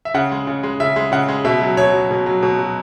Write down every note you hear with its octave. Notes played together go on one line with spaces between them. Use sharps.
E5
C#3 F#5
G#3
C#3
G#3
C#3 E5
G#3
C#3 F#5
G#3
B2 E5
F#3
B2 C#5
F#3
B2
F#3
B2
F#3